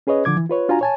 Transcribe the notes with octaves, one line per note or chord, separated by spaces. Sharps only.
C#4 G#4 B4 C#5 D#5
D3 F3 D6 G#6
E3
F4 B4 C#5
D4 F4 F#4 F5 G#5 A#5
C#5 G#5 A5